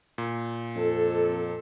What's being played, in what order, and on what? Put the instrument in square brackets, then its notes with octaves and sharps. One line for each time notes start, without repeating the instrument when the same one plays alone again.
[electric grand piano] A#2
[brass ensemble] F2 [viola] A4